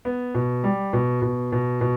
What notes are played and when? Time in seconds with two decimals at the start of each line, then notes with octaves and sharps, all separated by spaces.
0.05 B3
0.35 B2
0.64 G3
0.93 B2
1.22 B2
1.52 B2
1.81 B2